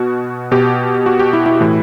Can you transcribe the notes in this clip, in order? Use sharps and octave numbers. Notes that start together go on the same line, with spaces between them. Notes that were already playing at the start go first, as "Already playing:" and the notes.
Already playing: B2 F#4
B2 G4
F#4
G4
E4
E4
A2 E3